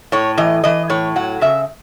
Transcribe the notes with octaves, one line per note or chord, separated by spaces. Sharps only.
A2 C#5
E3 D#5
E3 D#5
A2 C#5
F#3 F#5
C#3 E5